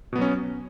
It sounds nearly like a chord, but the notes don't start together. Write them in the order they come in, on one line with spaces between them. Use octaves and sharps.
B2 B3 F#3 C#4